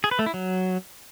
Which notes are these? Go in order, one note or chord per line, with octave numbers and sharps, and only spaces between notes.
G#4
B4
A3
E4
F#3